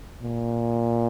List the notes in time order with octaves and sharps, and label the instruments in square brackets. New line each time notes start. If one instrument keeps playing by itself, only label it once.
[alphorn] A#2